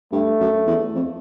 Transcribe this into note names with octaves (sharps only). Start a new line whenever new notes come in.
G2 A3
F#2
E2
F2